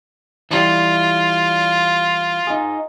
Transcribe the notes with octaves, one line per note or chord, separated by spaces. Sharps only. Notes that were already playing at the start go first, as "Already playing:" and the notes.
E3 G3 F4
D#4 G#4